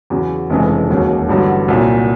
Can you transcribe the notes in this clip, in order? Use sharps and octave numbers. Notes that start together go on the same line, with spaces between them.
E2 C#3 F#3
F1 F2 C#3 E3 G#3
E1 D#2 C#3 F#3
A1 G2 D3 F#3 B3
C2 A#2 F#3